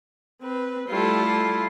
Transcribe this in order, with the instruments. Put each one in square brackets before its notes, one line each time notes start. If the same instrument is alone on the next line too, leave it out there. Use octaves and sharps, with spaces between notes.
[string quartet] C4 B4
[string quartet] G3 A3 A4 [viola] E4 F4